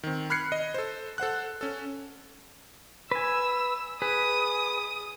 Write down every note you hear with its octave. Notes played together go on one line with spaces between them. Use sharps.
D#3 C4
B5 F6 F#6 G#6 C7 C#7
D#5
A4 C5
A4 C5 F#5 F#6
C#4 A4
B4 G#5 E6
G#4 B4 D#6